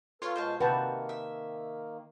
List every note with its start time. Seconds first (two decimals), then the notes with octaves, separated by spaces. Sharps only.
0.22 F4 A4 B4 C#5
0.36 B2 G#3 C5 C#5 A5
0.60 C3 D#3 A#3 F#4 B4 G5 A5
1.09 E5